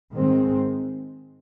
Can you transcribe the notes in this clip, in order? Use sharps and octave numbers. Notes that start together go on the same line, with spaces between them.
G#2 D#3 G#3 C4